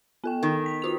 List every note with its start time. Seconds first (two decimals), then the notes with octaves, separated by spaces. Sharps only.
0.24 B3 A4 G5
0.43 D#3
0.66 B6
0.82 F4 F#4 F7